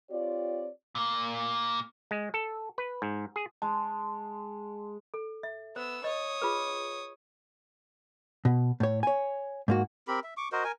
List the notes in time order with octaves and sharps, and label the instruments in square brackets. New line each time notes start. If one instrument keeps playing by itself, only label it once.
[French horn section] C4 F4 G4 C#5 D5
[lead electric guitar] A#2 A#3
[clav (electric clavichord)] G#3
A4
B4
G#2
G#4
[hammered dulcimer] G#3 [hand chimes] A5
[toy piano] A4
E5
[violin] B3 E6 [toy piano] C5
[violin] C#5 D#6 [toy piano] D#5
[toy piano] F4 G#4 B4
[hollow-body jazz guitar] B2
A2 C#5
C#5 G#5
G#2 A#3 F#4
[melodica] C4 G4 A#4 B5
E5
C#6 D6
F#4 A#4 C5 D#5
A#4 G#5